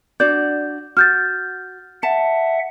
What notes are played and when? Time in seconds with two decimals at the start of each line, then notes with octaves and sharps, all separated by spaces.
0.20 D4 F#4 D5 G6
0.97 F#4 F6 G6 A6
2.03 E5 F#5 A5